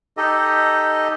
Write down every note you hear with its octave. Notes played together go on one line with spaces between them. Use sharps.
D#4 G4 A4 D#5